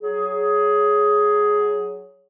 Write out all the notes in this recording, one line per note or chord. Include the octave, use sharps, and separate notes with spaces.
F#3 G#4